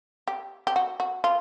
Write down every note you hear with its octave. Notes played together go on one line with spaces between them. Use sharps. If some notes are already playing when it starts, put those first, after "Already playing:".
G4
G4
F#4
F#4
F4